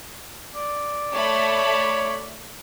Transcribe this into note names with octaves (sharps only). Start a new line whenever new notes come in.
D5
A3 C#5 B5